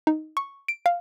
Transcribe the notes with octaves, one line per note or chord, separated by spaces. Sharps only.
D#4
C#6
D7
F5